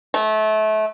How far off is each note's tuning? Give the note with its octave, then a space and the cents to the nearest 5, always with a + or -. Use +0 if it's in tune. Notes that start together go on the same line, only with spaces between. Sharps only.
A3 -30